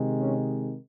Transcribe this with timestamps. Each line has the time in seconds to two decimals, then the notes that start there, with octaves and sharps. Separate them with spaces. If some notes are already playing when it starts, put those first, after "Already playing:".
Already playing: C3 D#3 G#3
0.20 C#4